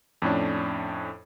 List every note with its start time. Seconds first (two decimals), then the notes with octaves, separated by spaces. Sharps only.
0.22 F2 A2 C#4 D4